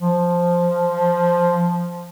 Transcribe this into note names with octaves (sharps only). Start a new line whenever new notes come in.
F3